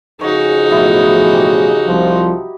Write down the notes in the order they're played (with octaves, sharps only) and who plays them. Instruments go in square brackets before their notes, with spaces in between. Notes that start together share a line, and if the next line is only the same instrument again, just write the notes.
[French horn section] F2 C#3 G#4 [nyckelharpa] D#4 F#4 [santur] C#5
[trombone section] A1 B2 F3 [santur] E4 D#5
[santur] G4
[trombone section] C2 F3